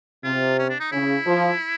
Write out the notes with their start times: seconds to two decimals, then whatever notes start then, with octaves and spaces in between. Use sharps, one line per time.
0.24 C3 F4
0.59 C#4
0.70 D4
0.80 D#4
0.92 C#3 E4
1.26 F3